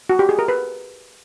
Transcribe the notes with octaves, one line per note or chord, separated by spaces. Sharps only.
F#4
G4
G#4
A#4
B4